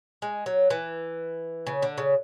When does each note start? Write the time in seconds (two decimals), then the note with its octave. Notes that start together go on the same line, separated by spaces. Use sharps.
0.22 G#3
0.46 F#3
0.70 E3
1.67 C#3
1.82 D3
1.98 C#3